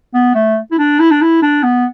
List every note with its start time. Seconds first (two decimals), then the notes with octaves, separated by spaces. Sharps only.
0.14 B3
0.35 A3
0.71 E4
0.78 D4
0.99 E4
1.10 D4
1.21 E4
1.42 D4
1.63 B3